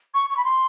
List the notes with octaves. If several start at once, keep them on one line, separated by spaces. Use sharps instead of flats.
C#6
C#6
B5
C6